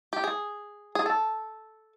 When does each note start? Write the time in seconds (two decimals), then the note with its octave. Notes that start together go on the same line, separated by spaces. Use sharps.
0.13 G4
0.24 G#4
0.95 G#4
1.06 A4